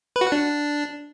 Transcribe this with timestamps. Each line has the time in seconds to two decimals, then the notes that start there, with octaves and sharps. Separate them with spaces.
0.16 B4
0.21 F#4
0.27 F#5
0.32 D4